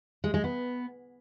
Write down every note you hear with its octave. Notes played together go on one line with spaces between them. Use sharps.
G#3
G#3
B3